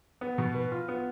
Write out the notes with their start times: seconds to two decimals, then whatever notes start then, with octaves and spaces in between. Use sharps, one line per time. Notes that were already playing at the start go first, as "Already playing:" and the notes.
0.21 B3
0.38 B2
0.55 B4
0.72 F4
0.88 B3